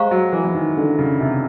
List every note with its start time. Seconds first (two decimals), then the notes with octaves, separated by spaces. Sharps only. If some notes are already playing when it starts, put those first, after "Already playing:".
Already playing: G#3 G4 C5 F5 A#5 C#6
0.11 F#3
0.33 E3
0.45 E3
0.54 D#3
0.77 D3
0.99 C#3
1.20 C3